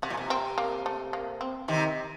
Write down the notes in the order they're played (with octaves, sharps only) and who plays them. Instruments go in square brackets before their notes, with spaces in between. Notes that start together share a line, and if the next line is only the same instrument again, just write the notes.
[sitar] C3 [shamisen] F#4
[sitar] A#2
C3
[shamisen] C4
A#3
A3
A#3
C4
[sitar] C3 D#3 [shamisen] C4